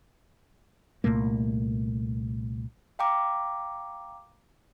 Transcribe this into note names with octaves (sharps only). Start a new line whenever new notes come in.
C2 A#2 A3 A#3
F5 G5 A#5 D6